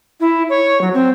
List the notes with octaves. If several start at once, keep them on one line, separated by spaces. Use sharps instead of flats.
E4
C#5
F#3
C4